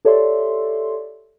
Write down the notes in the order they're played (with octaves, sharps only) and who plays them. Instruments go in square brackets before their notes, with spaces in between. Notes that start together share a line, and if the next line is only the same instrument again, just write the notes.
[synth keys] G4 A4 C#5 D5 E5 C6